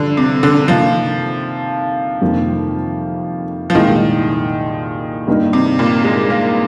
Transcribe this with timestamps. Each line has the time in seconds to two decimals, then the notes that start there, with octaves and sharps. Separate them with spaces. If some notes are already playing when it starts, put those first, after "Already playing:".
Already playing: G2 D3 F3
0.17 C3
0.43 D3
0.68 C3 D#3 F3 A#3 D#4
2.21 F2 C3 D#3 G3 A#3
3.70 F3
3.74 C2 A#2 D#3 G#3 D#4 G#4
5.27 G2 D#3 A#3 D#4 A#4
5.53 C3
5.79 A#2
6.04 G#3
6.30 A#3